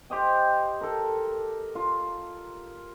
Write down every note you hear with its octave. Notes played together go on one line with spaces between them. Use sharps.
G4 C5 D#5 G5
A4 A#4
F4